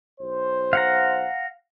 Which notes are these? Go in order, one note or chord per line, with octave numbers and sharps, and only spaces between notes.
B1 C5
F5 F#5 A#5